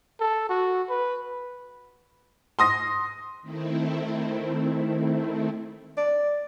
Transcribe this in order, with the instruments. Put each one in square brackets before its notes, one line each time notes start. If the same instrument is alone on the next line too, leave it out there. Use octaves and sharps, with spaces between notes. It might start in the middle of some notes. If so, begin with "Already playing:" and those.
[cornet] A4
F#4
B4
[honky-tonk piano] C6 D#6 A#6
[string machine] D#3 A3 C4 E4
[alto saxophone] D5